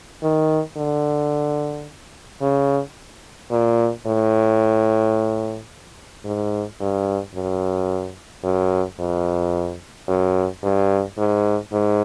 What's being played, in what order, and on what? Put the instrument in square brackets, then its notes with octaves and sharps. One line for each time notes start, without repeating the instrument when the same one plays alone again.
[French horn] D#3
D3
C#3
A#2
A2
G#2
G2
F#2
F#2
F2
F#2
G2
G#2
G#2